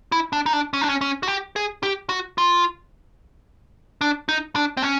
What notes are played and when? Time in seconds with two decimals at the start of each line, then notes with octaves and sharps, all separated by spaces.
0.12 E4
0.33 D4
0.46 D#4
0.53 D4
0.73 C#4
0.81 D4
0.89 C#4
1.01 C#4
1.23 F#4
1.28 G4
1.56 G#4
1.83 G4
2.09 F#4
2.38 F4
4.01 D4
4.29 D#4
4.56 D4
4.77 C4
4.82 C#4